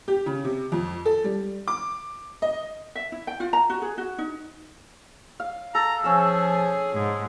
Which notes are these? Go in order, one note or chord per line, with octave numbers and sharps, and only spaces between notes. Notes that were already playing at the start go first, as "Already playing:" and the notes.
G4
C#3
C3
F2
A4
G3
D6
D#5
E5
E4
G5
F4
A#5
F#4
G#4
F#4
D#4
F5
A4 A#5
F3 C#4 G#4 E6
G#2 G#4